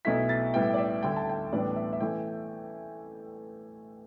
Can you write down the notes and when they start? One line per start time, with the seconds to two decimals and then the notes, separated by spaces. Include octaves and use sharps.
0.05 B1 B2 A3 E4 B6
0.29 A6
0.54 A2 G3 B3 E4 G5
0.74 D5
0.78 E5
1.03 D2 D3 G3 E4 G5
1.16 A5
1.29 G5
1.52 A1 A2 G3 B3 D4 D5
1.76 E5
1.93 E5
2.00 E3 A3 E4 G5